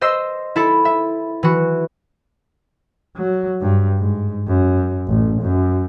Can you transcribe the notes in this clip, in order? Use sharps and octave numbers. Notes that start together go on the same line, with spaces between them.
C5 D#5 C6 E6 C7
E4 A4 B5
E5
E3 F#4
F#3
G2
G#2
F#2
A1
F#2